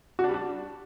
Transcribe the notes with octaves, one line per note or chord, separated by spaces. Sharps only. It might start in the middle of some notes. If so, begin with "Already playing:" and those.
F#4
D4
G3
D4